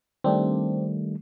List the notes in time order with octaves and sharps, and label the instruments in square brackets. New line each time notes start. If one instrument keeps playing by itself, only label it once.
[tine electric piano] D#3 G3 A3 [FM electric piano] C4 D4 G4